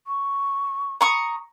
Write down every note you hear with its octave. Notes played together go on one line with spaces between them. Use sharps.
C#6
A#5 C#6 D#6